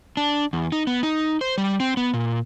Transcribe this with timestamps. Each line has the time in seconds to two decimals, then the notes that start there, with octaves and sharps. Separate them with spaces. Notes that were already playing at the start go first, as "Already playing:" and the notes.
0.17 D4
0.53 E2
0.72 D#4
0.87 B3
1.03 D#4
1.41 C5
1.58 G3
1.80 C4
1.97 B3
2.14 A#2